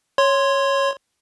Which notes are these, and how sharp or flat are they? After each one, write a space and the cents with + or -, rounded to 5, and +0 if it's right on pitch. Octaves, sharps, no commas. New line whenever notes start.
C#5 -5 C6 +0